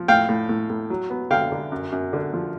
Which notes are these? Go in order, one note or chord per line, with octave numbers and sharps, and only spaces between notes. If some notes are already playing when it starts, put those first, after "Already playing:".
Already playing: F3
A2 F5 G5
A2
A2
A2
F#3
B3
D3 F5 G5
D3
F#2
F#2
D3
F3